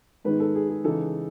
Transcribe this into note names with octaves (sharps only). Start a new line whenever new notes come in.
G#2 D#3 G#3 B3 D#4 B4
A4
G#4
G#4
C#3 E3 G#3 D#4 A4